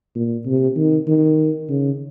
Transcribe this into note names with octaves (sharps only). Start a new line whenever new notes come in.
A#2
C3
D#3
D#3
C#3